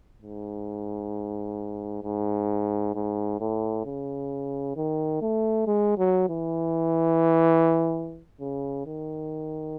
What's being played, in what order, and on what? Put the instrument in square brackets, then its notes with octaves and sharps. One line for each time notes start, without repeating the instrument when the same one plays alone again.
[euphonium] G#2
G#2
G#2
A2
C#3
D#3
A3
G#3
F#3
E3
C#3
D#3